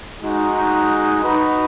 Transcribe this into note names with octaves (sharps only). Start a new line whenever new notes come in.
G#3 D#4 F#4
D#4 F#4 B4